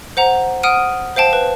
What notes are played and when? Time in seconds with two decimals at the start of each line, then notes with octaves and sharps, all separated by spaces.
0.17 C5 F#5 A#5
0.63 F#5 D#6 F6 D7 D#7
1.16 C5 F5 G5 A5
1.33 B4